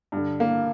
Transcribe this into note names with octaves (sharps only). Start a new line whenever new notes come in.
G2 D3
A#3